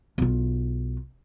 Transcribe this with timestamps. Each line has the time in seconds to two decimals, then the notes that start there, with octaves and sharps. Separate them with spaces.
0.18 B1 F4